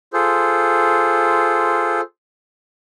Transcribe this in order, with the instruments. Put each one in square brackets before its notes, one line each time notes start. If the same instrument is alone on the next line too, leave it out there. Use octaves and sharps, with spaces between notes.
[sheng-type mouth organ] F4 G#4 A4 C5